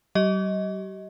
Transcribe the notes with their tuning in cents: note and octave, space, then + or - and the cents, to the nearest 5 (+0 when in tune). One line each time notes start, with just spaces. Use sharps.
G3 -45 G4 -35 D#5 +20